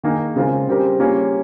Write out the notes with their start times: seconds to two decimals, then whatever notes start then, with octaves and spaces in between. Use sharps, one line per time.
0.03 D#3 A#3 D#4 G#4
0.36 C#3 G#3 C4 F4 A#4
0.68 C#3 G3 C4 G4 A#4
0.99 G3 A#3 C#4 F4 G#4